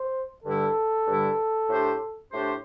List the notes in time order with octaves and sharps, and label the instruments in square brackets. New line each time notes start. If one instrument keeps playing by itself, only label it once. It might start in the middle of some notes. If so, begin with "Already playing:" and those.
Already playing: [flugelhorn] C5
[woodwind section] G2 D3 G3 E4 [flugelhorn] A4
[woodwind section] G2 D3 G3 E4
A2 A3 D4 G4 C5
A2 A3 D4 G4 C5